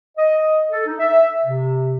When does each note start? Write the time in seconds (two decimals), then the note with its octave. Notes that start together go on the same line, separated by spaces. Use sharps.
0.17 D#5
0.71 A4
0.87 D#4
0.99 E5
1.46 C3